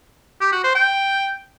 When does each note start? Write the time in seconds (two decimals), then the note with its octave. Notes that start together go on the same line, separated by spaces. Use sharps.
0.41 G4
0.52 F#4
0.64 C5
0.75 G5